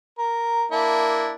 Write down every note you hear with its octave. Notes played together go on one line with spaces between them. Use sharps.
A#4
A#3 D4 E4